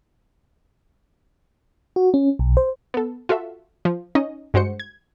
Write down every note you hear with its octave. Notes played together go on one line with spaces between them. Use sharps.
F#4
C#4
B1
C5
B3 A4
F4 F#4 A4 E5
F3
C#4 D#4 D#5
G2 G#3 F#4 C5 C#7
G#6